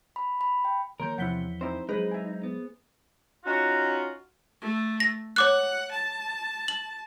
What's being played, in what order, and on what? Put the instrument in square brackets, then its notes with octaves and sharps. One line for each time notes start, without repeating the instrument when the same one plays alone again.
[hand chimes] B5
B5
G5
[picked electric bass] D#3 F3 A#3 [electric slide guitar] A#4 [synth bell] C#5 C6 G6
[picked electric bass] E2 [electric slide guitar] C3 [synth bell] F3 B6 G7 [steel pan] E4 F#5
[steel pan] C4 D#4 E4 [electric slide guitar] C5
[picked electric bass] F#3 G#3 [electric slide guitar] D#4 [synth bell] G#4 C5 [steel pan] B4
[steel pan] E5 G#5
[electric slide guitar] B3
[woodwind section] C#4 D#4 F4 F#4
[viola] A3
[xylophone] A#6
[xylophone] C#5 D6 F#6 [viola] F#5
[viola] A5
[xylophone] F#7